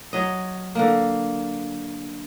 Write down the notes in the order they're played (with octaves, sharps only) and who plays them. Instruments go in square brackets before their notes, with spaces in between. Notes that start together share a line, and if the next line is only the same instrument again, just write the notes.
[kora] F#3 D#5
D3 A#3